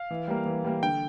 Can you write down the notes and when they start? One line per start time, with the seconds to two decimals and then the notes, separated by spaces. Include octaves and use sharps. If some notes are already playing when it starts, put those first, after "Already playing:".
Already playing: F5
0.10 E3
0.28 G3 A#3
0.46 E3
0.65 G3 A#3
0.83 D3 G5